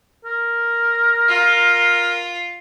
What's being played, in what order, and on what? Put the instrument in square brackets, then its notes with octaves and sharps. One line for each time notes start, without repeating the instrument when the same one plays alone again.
[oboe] A#4
[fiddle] F4